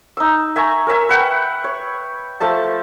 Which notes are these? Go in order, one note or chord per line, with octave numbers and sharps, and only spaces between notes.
D#4 E6
E5 G#5 A#5 C#6
A#4 C#5 E5 G#5
B4 F#5 G5
C#5
F3 A3 E5 A5